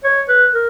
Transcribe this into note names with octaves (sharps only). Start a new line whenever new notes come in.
C#5
B4
A#4